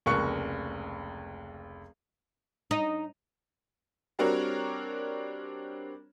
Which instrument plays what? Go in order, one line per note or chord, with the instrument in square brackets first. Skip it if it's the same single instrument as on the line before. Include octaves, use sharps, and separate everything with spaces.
[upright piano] F1 C#2 A#3 C#6 F#6 C#7
[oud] D#4
[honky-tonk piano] G3 C4 D4 F#4 A#4 C#5